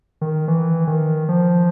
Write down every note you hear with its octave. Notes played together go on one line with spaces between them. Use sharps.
D#3
E3
D#3
F3